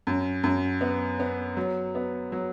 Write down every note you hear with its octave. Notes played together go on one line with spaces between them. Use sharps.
F#2
F#2
B3
B3
F#3
B3
F#3